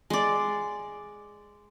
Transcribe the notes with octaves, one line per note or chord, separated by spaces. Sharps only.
G#3 D5